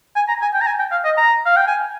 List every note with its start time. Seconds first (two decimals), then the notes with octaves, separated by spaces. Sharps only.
0.16 G#5
0.28 A#5
0.42 G#5
0.54 G5
0.61 A#5
0.67 G#5
0.79 G5
0.92 F5
1.05 D#5
1.17 A#5
1.46 F5
1.56 G5
1.67 G#5